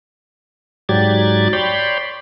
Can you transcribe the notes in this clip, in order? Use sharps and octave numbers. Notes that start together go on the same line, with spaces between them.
G#2 F#3 G4 D5 G#6 A6
C#5 D5 G5 B5 C6